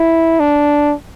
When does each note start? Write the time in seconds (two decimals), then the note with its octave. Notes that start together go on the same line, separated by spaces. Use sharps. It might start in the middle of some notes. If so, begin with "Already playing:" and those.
Already playing: E4
0.40 D4